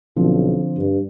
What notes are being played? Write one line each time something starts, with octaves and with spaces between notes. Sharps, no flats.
B1 D3 F3 C4
G2